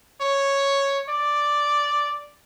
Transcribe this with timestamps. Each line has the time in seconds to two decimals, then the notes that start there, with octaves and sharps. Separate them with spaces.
0.21 C#5
1.09 D5